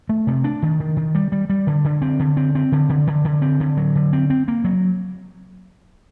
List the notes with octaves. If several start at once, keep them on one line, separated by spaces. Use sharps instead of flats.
A3
C3
D4
D#3
D#3
D#3
G3
G3
G3
D3
D3
C4
D3
C4
C4
D3
D3
D3
D3
C4
D3
F#3
D3
C4
C4
A#3
F#3